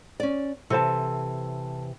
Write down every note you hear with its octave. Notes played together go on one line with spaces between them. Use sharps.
C#4 D5
C3 E3 A4 C5 A5